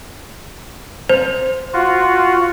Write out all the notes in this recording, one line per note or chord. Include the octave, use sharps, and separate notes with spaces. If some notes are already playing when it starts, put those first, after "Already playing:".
C5
F4 F#4